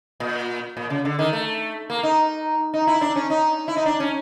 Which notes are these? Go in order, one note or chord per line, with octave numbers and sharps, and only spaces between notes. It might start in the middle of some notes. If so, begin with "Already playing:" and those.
A#2
A#2
C#3
D3
D#3
A3
A#3
D#4
D#4
E4
D4
C#4
D#4
E4
D#4
D4
C#4